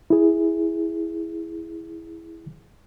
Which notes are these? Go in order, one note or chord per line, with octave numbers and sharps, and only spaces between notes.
E4 G#4